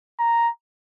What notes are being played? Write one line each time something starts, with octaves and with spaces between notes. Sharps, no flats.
A#5